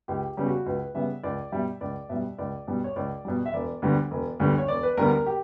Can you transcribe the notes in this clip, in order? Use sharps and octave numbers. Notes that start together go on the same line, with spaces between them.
C#2 G4
C#3 G3 B3
F#4
C#2 B4
C#3 G3 B3 E5
C#2 D5
B2 G3 E5
C#2 D5
B2 G3 E5
C#2 D5
B2 G3
C#5
C#2 D5
B2 G3
E5
E1 D5
D2 D3 G3 B3
E1
D2 D3 G3 B3
C#5
E1 D5
B4
D2 D3 G3 B3 A#4
A#4
G4